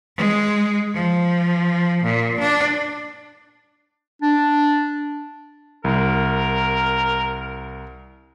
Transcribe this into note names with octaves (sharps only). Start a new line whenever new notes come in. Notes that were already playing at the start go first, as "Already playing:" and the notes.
G#3
F3
A#2
D4
D4
C2 A#4